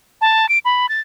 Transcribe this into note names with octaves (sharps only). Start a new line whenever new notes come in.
A5
D7
B5
A6